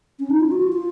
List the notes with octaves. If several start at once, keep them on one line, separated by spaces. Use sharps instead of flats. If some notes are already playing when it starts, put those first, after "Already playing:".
C#4
D#4
F4
F#4
F4
F4